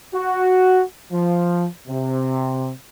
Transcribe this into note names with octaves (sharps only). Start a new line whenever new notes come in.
F#4
F3
C3